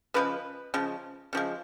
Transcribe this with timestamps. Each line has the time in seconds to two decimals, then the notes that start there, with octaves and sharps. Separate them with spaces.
0.14 C#3 F3 G#3 B4
0.74 C#3 F3 G#3
1.33 C#3 F3 G#3